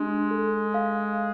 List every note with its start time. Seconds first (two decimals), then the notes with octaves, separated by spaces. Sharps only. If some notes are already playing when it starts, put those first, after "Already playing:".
Already playing: G#3 D4 G4
0.31 A4
0.74 F5